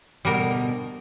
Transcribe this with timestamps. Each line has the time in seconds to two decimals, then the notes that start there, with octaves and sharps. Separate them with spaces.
0.25 D2 B2 G3 A#4